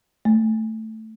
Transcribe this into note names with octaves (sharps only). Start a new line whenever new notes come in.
A3